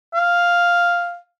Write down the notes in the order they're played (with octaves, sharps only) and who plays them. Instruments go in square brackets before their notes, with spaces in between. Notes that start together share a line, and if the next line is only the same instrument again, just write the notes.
[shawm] F5